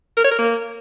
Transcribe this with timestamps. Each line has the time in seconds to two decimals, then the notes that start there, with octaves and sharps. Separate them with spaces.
0.17 A#4
0.24 C#5
0.31 A#4
0.39 A#3